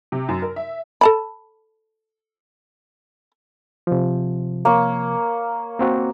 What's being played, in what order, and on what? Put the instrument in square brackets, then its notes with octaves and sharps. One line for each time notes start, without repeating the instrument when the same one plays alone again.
[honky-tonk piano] C3
F#2
A#4
E5
[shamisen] A4 A5 B5
[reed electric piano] C3 F3
[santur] A#3 C#5
[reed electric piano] A#3 C4 F#4